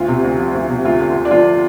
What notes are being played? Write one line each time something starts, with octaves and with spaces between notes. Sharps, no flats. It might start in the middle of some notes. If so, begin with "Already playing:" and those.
Already playing: D2 F4
C3
D2
F3
D2
C3
D2 F4
D3
D2
D4
F3 F4